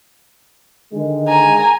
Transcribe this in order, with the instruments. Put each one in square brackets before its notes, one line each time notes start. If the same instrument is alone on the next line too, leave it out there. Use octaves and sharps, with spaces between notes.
[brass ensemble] D3 D#3 G#3
[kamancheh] G#5 A#5